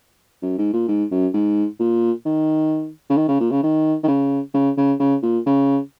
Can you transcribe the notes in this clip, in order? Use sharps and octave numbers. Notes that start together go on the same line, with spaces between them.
F#2
G#2
A#2
G#2
F#2
G#2
A#2
D#3
C#3
D#3
C#3
A#2
C#3
D#3
D#3
C#3
C#3
C#3
C#3
A#2
C#3